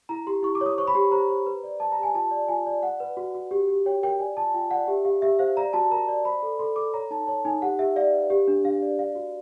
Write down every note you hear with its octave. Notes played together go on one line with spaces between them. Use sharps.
E4 A#5
G4 C6
E4 C#6
D6
C#5 D#6
C5 C#6
B5
G4 C6
C5 A#5
C5
B4
D5
B4 A5
A#5
G4
G#5
F4 A5
D5
F4 G#5
D5
D5 F#5
B4
F#4
F#4
G4
G4
C#5 G5
A#4 G5
D5 G#5
F4 A5
F4 G5
D5 F#5
G4 E5
G4 F5
G4 E5
C5 F5
D5 A#5
F#4 A5
A#4 A#5
D5
C5 B5
A4
A4 C6
A4 D6
C#5 A#5
D#4 A5
C#5 A5
D#4 G#5
G4 F#5
G4 E5
D5 F5
B4
G4
D4
D4 F5
D5
D5 F5
F#4